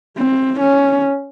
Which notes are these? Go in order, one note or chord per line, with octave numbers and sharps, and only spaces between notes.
C4
C#4